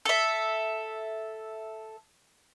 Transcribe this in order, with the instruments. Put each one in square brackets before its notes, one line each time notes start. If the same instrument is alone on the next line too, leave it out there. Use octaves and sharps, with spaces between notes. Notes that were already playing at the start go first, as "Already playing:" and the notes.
[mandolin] A4 E5